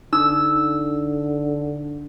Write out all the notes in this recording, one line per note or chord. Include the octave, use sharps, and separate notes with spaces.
D3 D#4 E6